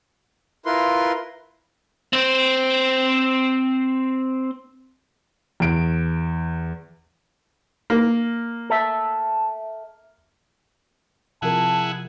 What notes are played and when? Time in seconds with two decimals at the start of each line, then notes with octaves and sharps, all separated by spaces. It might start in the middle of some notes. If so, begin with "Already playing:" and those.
0.66 E4 F4 A#4 B4 C6
2.13 C4 C5
5.60 E2 D7
7.90 A#3
8.70 A4 E5
11.42 C3 F3 E4 G#4 A#4 F#5 A5